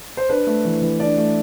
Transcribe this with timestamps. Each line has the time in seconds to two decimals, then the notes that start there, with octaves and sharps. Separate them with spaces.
0.17 C5
0.29 D4 B4
0.47 A3
0.65 E3
0.82 E3
1.00 D4 D5
1.17 A3